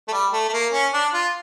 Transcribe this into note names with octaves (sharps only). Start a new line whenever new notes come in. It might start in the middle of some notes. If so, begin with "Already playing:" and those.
A3
G3
A3
A3
A#3
C#4
D4
F4